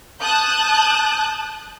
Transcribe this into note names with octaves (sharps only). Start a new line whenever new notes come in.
A5 D#6 F#6 G6